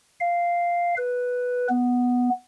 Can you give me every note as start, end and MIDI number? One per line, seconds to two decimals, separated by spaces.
0.20 0.94 77
0.97 1.67 71
1.69 2.30 59